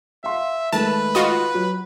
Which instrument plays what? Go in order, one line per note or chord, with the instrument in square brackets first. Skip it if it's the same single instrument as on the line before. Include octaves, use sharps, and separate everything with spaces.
[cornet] E5 [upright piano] F5 C6
[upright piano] D#3 G#3 A3 [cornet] B4 [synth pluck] A5
[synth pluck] F4 F#4 D#5
[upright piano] F#3